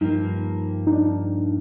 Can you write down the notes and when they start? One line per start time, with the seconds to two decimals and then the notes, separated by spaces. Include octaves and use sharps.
0.01 G2 F3 A#3 D#4
0.87 D#4
0.92 D4